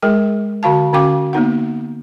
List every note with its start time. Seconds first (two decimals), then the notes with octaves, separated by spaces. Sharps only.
0.02 G#3 G#4 A#4 G5
0.63 D3 F#4 F5 A5
0.93 D3 C#4 F#4 F5 G5 D6
1.33 A#3 B3 D#4 F#5